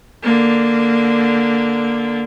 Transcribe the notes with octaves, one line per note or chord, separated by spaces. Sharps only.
D3 A#3